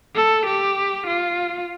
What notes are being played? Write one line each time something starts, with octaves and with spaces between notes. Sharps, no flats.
A4
G4
F4